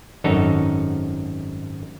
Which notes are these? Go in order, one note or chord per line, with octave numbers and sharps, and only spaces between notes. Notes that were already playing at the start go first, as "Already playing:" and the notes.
G#1 F#2 D#4 A4 C#5